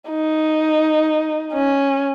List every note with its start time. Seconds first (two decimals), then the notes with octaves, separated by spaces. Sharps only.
0.10 D#4
1.53 C#4